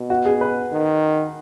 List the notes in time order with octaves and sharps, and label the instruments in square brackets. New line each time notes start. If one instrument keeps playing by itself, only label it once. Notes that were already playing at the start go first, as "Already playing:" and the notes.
Already playing: [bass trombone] B2
[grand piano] F#4
G#4
B4
[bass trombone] D#3